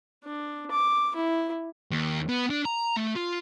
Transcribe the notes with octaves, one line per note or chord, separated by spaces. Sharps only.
D4
D6
E4
D#2
B3
D4
A#5
A3
F4